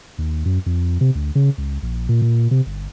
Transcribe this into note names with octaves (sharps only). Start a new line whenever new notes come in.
D#2
F#2
F2
C3
D2
C#3
C#2
A#1
A#2
A#2
C3
G1